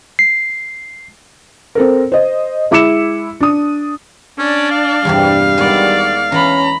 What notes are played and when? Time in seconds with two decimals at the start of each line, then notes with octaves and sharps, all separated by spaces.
0.19 C7
1.75 C4 A4 A#4
2.12 C5 D#5
2.71 G#3 E4 D6 E6 C#7 E7
3.40 D4 D#6
4.39 C#4 D4 D5
4.71 F5
5.05 E2 G2 C3 G3
5.58 D#3 G#3 B3 D5
6.32 E3 C#4 D5 A#5 B5